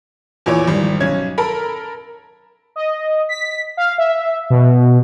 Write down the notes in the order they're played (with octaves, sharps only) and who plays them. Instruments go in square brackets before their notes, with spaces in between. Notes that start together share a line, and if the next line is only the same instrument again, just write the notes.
[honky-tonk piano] E2 A#2 E3 C#5 D6
G#1 G3
B1 C#4 G#6
A4 A#4 B5
[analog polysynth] D#5
B6
F5
E5
B2